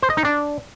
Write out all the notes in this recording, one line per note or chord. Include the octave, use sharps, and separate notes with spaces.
C5
D#5
D#4
D4